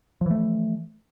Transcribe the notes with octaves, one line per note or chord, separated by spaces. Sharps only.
E3 F3 A3